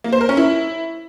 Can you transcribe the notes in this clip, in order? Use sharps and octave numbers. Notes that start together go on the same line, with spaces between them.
A#3
C5
A#4
C#4
E4